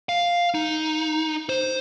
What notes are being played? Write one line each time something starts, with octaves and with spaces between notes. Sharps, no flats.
F5
D#4
C5